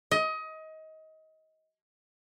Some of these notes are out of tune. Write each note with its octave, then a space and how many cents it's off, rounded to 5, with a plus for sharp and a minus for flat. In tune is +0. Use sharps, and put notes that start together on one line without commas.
D#5 +25